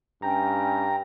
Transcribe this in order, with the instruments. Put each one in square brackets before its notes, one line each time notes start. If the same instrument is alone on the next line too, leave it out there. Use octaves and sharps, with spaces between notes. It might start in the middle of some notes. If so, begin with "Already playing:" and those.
[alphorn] G2 [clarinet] C#4 [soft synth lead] G5 [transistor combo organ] A#5